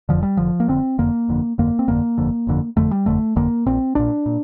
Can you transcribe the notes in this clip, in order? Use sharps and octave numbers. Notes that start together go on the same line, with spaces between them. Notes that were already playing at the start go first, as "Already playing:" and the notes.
F1 F2 D3 F3
G3
F1 F2 D3 F3
A#3
F1 F2 D3 C4
F1 F2 D3 A#3
G1 F2 D3
G1 F2 D3 A#3
C4
G1 F2 D3 A#3
G1 F2 D3
G1 F2 D3
G1 F2 D3 A3
G3
G1 F2 D3 A3
G1 F2 D3 A#3
A#1 A#2 C4
A#1 A#2 D4
A#2